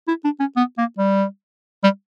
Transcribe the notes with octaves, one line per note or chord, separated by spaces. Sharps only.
E4
D4
C#4
B3
A#3
G3
G3